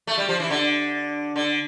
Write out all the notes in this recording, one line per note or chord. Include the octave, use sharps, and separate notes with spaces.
A3
G3
F3
E3
D3
D3